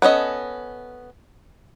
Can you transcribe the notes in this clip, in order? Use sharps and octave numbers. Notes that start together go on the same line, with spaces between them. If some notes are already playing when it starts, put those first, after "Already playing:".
B3 C#4 A4 D#5